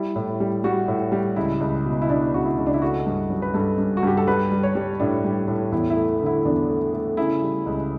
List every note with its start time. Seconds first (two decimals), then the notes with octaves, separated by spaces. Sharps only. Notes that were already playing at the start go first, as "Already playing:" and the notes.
Already playing: G3 E4
0.16 A2
0.40 G3
0.64 G3 F#4
0.88 A2
1.12 G3
1.36 C#2 E4
1.61 C#2
1.85 B2
2.02 E4
2.09 B2 D4
2.34 C#2 F#4
2.45 E4
2.58 C#2
2.66 D4
2.74 E4
2.82 A3 F#4
3.06 G2
3.30 F#3
3.42 B4
3.54 G2 A4
3.78 G2
3.97 F#4
4.03 G2 G4
4.17 A4
4.27 G3 B4
4.52 G3
4.63 C#5
4.75 G3
5.00 A2 D4
5.25 G3
5.48 A2
5.72 E2 E4
5.90 E4
5.97 A3
6.21 D3
6.26 E4
6.45 E2 D4
6.70 A3
6.94 A3
7.17 C#3 E4
7.42 G3
7.66 C#2